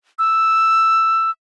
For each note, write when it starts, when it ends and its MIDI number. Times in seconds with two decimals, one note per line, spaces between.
0.19 1.30 88